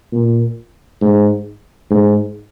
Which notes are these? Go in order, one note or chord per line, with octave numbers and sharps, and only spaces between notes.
A#2
G#2
G#2